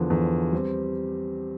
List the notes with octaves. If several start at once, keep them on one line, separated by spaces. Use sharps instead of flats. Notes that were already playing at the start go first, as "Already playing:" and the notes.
Already playing: E2 D3 F3
E2 D3 F3
G3 C4 G4